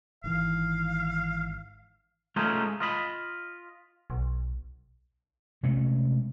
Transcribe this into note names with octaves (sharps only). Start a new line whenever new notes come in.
G#1 D#3 E3 F5
G#3 A3 C#4 D#4 F4
F4 D#5 B5
B1
C3 G#3 A3 C#4